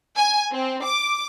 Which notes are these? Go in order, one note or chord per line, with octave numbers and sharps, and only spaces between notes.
G#5
C4
D6